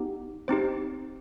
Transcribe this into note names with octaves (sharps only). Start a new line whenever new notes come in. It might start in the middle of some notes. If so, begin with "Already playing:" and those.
Already playing: B3 D#4 G4
C4 D#4 G4 C5